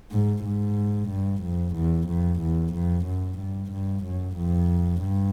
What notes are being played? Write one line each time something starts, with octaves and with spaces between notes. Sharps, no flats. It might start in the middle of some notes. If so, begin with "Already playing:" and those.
G#2
G#2
G2
F2
E2
F2
E2
F2
F#2
G2
G2
F#2
F2
G2